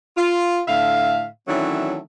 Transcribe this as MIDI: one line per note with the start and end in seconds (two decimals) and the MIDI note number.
0.17 0.62 65
0.68 1.26 45
0.68 1.26 50
0.68 1.26 76
0.68 1.26 77
1.48 1.98 51
1.48 1.98 52
1.48 1.98 54
1.48 1.98 57
1.48 1.98 61
1.48 1.98 62